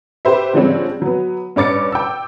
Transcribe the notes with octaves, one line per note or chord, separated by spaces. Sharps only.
G4 B4 C5 E5
D3 F3 G3 G#3 C4 C#4
F#3 B3
G2 C#4 D6 A6 C#7
G5 E6